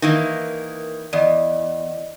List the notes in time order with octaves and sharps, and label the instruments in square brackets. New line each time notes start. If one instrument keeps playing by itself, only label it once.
[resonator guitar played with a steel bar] D#3 E3 A#3
[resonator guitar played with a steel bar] E2 [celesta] D5 D#5